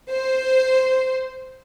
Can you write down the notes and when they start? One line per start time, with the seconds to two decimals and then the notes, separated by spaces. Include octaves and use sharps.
0.12 C5